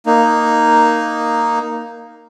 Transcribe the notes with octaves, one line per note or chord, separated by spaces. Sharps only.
A#3 D#4